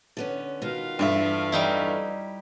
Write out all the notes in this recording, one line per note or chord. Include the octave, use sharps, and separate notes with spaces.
D3 B3 C#4
B2 D#3 B3 F4 F5
E2 G2 A4 E5
G3 D#4 E4